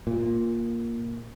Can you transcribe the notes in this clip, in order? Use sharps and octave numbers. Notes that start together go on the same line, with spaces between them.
A#2